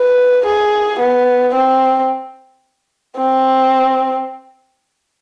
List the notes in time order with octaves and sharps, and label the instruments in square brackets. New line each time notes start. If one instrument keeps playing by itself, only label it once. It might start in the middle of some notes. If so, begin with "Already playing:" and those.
Already playing: [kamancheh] B4
G#4
B3
C4
C4